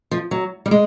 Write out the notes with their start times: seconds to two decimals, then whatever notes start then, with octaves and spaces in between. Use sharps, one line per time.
0.11 F3
0.31 F#3
0.66 G3
0.71 G#3